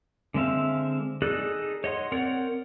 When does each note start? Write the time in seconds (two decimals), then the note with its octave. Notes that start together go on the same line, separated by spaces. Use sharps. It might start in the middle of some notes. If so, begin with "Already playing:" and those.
0.34 D3 G#3 C4 E5 F5
1.22 D#4 G#4 A4 D5 F#6
1.84 C#5 D#5 F#5 C6
2.12 C4 A#4 C#5 D5 F#5